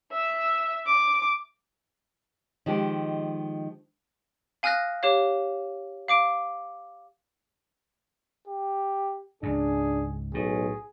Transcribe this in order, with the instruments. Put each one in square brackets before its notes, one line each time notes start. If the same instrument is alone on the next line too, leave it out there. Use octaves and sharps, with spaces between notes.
[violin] E5 E6
D6
[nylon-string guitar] D#3 F3 G#3 G4
[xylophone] F5 G#5 D#6 F6 F#6 A#6
G4 C#5 F5
F5 D6 D7
[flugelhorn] G4
[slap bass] C#2 G#2 [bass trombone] D4 [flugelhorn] G#4
[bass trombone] B1 [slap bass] A2 [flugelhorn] G#4